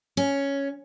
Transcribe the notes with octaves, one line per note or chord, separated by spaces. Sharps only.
C#4